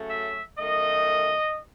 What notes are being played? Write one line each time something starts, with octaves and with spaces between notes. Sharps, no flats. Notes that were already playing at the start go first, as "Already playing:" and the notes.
Already playing: C#3 F#3 A3 C#4
E5
F#2 D#3 A3 D#5